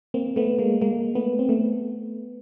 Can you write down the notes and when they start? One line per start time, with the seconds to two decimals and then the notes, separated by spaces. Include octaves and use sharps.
0.14 A#3 C4
0.36 A3 B3
0.59 G#3 A#3
0.82 G#3 A#3
1.15 A3 B3
1.39 C4
1.49 A3 B3